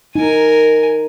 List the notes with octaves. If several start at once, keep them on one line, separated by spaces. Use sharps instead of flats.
D#4 A#4 G#5